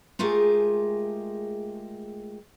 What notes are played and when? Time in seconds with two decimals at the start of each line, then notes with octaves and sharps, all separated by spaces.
0.19 G#3 A3 F4 G4 G#4 A#4